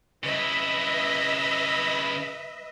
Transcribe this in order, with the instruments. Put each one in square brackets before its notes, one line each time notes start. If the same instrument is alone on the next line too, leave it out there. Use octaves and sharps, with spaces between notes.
[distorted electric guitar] C#3 E4 [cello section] B4 D#5 E5